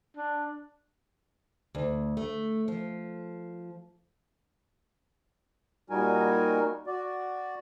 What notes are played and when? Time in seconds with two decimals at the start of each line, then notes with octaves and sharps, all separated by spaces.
0.17 D4
1.75 D2
2.17 A3
2.68 F3
5.90 A#2 G3 D#4 F#4 A#4 G#5
6.87 F#4 D5